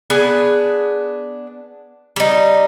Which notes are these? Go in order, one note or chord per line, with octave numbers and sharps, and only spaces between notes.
B3 D4 G#4 B4
G3 D#4